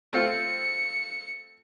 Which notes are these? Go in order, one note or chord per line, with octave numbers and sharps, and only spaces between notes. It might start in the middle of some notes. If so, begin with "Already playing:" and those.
A3 C4 F4 C#7